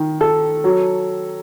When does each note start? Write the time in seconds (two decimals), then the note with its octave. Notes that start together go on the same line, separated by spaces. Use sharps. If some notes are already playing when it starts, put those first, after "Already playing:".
Already playing: D#3
0.21 A4
0.64 F#3